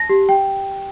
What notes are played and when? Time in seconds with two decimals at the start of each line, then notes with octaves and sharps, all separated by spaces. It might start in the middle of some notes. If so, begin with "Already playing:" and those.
Already playing: A5 A#6
0.09 G4
0.29 G5